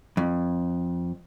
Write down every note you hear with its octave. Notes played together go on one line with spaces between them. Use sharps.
F2